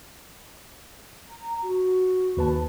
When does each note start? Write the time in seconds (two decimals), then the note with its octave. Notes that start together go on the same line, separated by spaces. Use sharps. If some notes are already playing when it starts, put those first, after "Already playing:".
1.29 A#5
1.63 F#4
2.37 D#2 B4 A5